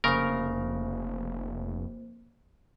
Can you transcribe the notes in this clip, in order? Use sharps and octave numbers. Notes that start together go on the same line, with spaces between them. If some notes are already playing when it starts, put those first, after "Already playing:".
F1 C#3 A#3 A#4 C5